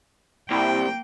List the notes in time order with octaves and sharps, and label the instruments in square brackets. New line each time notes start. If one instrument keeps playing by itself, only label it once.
[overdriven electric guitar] C2 [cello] A#3 G5